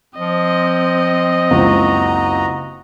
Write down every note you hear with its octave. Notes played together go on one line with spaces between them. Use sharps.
F3 C4 D#5
F#1 C#2 F#4 A#5